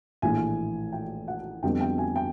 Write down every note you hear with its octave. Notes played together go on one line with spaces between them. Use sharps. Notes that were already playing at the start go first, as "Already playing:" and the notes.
A#1 A2 E3 G#5
G5
F#5
F2 D3 G3 B3 G5
G5
G#5
G5